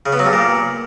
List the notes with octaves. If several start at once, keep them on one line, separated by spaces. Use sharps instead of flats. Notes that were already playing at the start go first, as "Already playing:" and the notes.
C#3
B3
F#3
G2
A#2